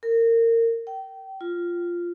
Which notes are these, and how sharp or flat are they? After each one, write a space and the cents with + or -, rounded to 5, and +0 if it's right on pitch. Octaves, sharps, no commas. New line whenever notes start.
A#4 -25
G5 -25
F4 -5